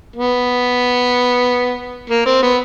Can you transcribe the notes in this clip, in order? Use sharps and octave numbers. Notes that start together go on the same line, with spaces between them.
B3
A#3
C4
B3